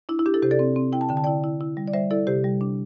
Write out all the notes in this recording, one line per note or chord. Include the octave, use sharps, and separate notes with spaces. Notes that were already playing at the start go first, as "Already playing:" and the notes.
D4 E4
E4
D4 G4
E4 A4
C3 G4 C5
A4 D5
C4
C4
E4 G5
A5
D3 G5
A5
E4 D5 G5
E4
E4
G3
D5
G3 C5 E5
E4 A4 D5
C3 G4 C5
G3
D4